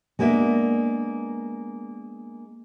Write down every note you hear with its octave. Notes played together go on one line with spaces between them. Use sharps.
G#3 A#3 B3 D4 E5